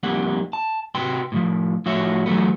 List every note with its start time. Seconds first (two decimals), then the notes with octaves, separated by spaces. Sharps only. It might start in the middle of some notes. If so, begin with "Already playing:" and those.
0.03 F2 G3 A#3 F#5
0.53 A5
0.95 C3 F#4 B4 G5 C6
1.32 A2 E3 F3
1.86 A2 F3 F#4 C#5 E5
2.26 E3 F#3 G#3 A3 B3